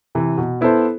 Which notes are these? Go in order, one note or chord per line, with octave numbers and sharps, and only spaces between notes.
C3 E3
B2
B3 E4 A4 C5